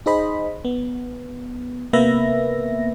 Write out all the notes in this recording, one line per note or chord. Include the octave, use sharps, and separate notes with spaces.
D#4 G#4 C5 D#5 B5
B3
C3 A#3 B3 B4 E5 A#6